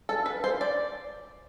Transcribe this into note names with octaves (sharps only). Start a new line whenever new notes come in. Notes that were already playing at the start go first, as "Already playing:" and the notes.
A4
B4
C5
D5